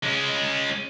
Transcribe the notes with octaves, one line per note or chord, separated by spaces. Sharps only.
G#3 C#4